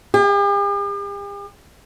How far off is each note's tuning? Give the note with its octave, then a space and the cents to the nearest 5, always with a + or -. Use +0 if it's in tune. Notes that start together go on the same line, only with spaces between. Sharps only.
G4 +45